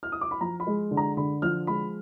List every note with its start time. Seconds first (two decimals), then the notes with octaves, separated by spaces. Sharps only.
0.03 F6
0.12 D#6
0.21 D6
0.31 B5
0.40 F3 A#5
0.60 B5
0.67 G#3
0.91 D3
0.97 A#5
1.17 D3 B5
1.42 F3 F6
1.67 G#3 B5